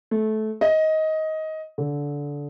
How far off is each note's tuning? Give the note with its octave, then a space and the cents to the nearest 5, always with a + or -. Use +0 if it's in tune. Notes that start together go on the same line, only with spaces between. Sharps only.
A3 -20
D#5 +15
D3 -20